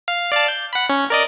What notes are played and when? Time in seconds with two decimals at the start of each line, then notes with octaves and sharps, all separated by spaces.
0.08 F5
0.32 D5 F5 A5
0.48 G6
0.73 F#5 B5
0.89 C#4
1.10 A#4 D5 D#5